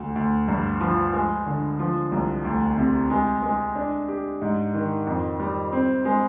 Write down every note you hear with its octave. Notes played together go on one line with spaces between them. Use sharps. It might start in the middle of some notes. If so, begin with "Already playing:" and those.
Already playing: D2
D2
G2
F3
G#3
D3
F3
C2
D2
C3
G#3
G#3
D4
G4
G#2
D#3
F2
G3
C4
G#3